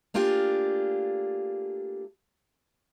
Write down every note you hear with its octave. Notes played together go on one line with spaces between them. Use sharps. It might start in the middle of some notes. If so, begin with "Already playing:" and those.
A3 A#3 D4 F4 G4 G#4